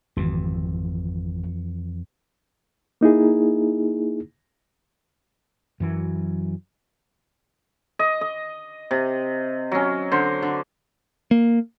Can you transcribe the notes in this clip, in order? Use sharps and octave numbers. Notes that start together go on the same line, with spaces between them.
G#1 F2 E3
A#3 D#4 E4 G#4
F#2 E3 F#3
D#5
D#5
C3
F#3 C#4
D3 C5
D3
A#3